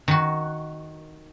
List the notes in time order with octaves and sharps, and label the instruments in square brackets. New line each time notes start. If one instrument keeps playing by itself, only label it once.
[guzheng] D#3 F#4